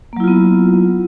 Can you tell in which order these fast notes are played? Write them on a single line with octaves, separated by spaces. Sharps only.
A#3 F#3 E4 F4 B3